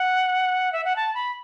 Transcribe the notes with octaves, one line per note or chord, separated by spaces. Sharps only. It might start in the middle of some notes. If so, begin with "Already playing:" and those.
Already playing: F#5
E5
F#5
A5
B5